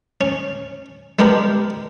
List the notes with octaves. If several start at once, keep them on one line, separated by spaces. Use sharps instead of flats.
C#4
G#3 B3 D4 G4 A#4